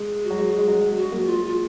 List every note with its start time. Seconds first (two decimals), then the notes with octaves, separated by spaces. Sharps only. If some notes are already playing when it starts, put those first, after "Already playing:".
Already playing: G#3
0.24 F#4
0.30 F#3
0.38 G#3
0.58 G#3
0.68 F#3
0.80 F#3
0.90 G#3
0.97 F#4
1.12 F#3 A#3
1.26 F4
1.34 G#3
1.45 F4